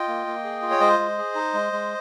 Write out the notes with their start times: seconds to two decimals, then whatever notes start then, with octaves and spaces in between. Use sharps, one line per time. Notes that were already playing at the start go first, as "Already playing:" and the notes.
Already playing: F4 D#5 G5
0.08 A#3
0.27 A#3
0.44 G#4
0.62 F4
0.71 C#5
0.80 G#3 C5 D#5
0.99 G#3
1.18 G#4
1.35 D#4
1.54 G#3
1.73 G#3